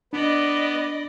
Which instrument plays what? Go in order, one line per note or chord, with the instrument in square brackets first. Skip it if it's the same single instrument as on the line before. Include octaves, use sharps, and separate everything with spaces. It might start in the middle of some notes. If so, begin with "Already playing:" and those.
[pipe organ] B3 [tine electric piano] D4 [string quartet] D5 D#5 B5